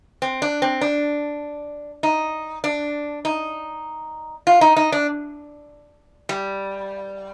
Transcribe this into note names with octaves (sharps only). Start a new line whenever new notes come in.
C4
D4
C4
D4
D#4
D4
D#4
F4
D#4
D#4
D4
G3